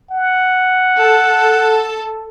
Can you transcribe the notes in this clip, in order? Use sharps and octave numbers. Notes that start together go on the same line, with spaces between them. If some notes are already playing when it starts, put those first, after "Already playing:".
F#5
A4